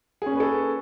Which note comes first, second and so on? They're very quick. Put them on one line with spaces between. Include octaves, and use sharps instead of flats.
G#4 C#4 A#3 B4 A4